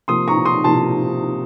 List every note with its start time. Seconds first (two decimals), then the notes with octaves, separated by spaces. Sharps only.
0.08 C3 F3 A#3 C6 D#6
0.28 A#5 C#6
0.45 C6 D#6
0.64 C3 F3 A#3 A5 C6